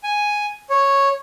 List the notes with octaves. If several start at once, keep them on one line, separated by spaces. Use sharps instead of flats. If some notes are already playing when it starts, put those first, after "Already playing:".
G#5
C#5